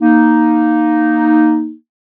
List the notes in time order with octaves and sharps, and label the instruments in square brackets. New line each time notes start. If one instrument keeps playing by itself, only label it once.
[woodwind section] A#3 D#4